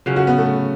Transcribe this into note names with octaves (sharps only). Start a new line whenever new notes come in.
C#3 F#3 C#4
F#4
B3
A3